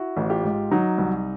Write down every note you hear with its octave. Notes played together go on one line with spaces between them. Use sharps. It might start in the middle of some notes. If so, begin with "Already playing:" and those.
Already playing: E4 F#4
A1
F4 G4
G#2
F#3 D#4
C2